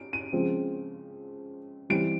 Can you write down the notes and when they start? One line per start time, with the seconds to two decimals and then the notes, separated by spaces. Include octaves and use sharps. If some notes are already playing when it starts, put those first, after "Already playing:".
Already playing: D7
0.13 D#7
0.33 C#3 F3 G#3 C4
1.90 E3 G3 C4 D7